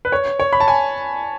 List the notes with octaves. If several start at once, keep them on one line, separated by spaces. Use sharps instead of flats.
B4
C#5
C#5
B5
A5
G#5